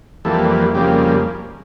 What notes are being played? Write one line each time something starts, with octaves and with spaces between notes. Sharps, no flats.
F2 E3 G3 A#3 A4
F2 C#3 G3 A#3 G4